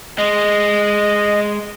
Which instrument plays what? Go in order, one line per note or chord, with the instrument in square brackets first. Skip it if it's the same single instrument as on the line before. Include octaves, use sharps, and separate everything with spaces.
[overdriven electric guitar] G#3 [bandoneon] D#5